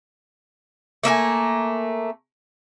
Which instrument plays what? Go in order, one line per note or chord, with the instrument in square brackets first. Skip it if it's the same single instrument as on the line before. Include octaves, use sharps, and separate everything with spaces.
[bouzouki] A3 A#3 E5 G#5